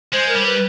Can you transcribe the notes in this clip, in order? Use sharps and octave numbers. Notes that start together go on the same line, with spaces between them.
G#3 C5
A#4
G3
C5
B4